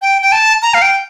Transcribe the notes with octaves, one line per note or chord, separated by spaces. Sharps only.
G5
G5
A5
A#5
F5
G5